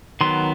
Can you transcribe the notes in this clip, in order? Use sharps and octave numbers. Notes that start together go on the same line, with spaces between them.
D#3 F#3 B3 C6